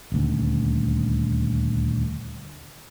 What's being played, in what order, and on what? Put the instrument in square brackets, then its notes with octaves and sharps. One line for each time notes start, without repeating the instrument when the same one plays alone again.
[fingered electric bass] D#1 D2